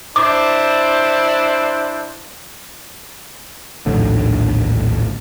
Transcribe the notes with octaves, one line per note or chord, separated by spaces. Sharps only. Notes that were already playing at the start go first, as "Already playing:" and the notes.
D4 E4 C5 D6
A#1 D#2 A2 D3